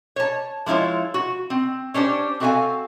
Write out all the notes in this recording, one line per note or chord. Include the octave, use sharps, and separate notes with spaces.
C#5 A5
F3 G#3 E4 F4 C#5
F#4
C4
C#4 D4 G4 C5
C4 F#4 A4 E5 F5 G#5